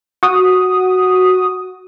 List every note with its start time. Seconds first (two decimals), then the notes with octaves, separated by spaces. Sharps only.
0.23 F#4 D#6